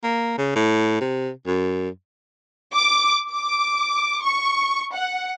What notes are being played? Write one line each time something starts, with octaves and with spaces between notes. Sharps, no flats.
A#3
C#3
A2
C3
F#2
D6
D6
C#6
F#5